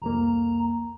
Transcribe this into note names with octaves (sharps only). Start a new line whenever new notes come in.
C2 F2 A#3 A#5